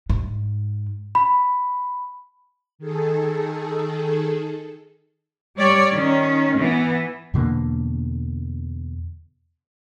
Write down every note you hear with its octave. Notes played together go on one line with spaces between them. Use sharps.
G#2
B5
D#3 G#4 A4
G3 C#5 D5
D#3 C#4
E3 B3
E2 B2 D3 A#3